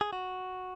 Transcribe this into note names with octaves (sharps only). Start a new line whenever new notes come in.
G#4
F#4